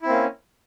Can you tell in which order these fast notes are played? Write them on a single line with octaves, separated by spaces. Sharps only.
E4 C4 A#3 C#4